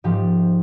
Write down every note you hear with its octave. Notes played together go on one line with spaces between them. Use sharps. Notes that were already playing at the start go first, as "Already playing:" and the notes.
G#2 F3 G#3 G4